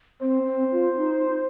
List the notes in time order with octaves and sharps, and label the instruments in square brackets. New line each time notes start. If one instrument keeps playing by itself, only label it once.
[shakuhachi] C4 [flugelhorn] C5
[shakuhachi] C4
F4
D#4